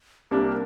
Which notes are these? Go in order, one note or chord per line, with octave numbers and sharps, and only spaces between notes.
C2 C3 G3 A#3 D4 A#4